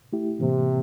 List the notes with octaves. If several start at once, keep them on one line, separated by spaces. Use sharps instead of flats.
A3 E4 G4
A2 C3 E3 A#3